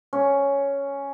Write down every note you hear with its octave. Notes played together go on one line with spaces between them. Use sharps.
C#4